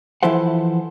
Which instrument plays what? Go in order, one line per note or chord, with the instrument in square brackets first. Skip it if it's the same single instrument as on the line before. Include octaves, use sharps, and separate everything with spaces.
[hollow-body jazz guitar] E3 F3 E4 A4 C5 F#5